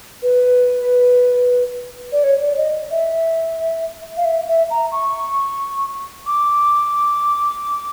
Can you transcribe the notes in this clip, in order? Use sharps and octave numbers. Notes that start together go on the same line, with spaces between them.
B4
D5
C#5
D5
D#5
E5
F5
E5
E5
A#5
C#6
D6